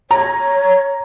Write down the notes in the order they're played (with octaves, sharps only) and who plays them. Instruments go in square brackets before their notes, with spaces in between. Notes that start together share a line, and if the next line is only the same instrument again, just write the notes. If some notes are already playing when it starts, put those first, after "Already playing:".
[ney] C#5 [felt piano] A#5